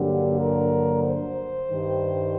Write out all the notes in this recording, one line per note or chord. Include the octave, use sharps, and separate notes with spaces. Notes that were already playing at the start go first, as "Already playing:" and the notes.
Already playing: G2 D3 F#3 A#3 D4 G4
A#4
C5
G2 D#3 G3